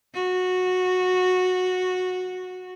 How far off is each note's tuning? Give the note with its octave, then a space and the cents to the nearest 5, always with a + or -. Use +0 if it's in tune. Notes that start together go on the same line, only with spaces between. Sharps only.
F#4 -15